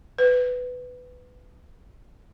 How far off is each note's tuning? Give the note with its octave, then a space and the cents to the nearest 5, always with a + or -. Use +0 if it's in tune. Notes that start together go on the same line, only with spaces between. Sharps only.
B4 +15